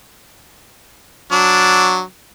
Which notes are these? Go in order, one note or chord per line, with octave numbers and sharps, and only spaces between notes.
F#3 D4